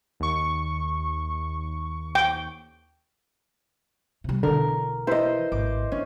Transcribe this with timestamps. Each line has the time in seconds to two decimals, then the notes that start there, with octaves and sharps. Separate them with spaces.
0.20 D#2 C#6
2.15 G5
4.24 C3 G3
4.43 B1 D3 E3 A#4
5.07 E4 C5 D#5
5.52 G#1 D6
5.92 C#4 D4